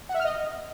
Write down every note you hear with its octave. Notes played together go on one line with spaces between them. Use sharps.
F#5
E5
F6
D#5